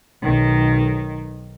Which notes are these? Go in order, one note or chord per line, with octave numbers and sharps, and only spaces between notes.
B1 D#3